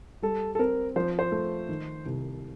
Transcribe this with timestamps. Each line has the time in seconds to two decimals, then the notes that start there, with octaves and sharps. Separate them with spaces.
0.22 G3 A4
0.55 A4
0.59 C4 A#4
0.96 F3 C5
1.19 C5
1.32 A3
1.69 D#3
2.06 C2